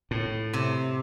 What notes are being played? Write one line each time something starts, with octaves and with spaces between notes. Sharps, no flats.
A2
C3